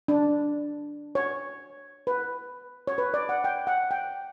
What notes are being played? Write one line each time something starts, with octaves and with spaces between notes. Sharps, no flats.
D4
C#5
B4
C#5
B4
D5
F#5
G5
F#5
G5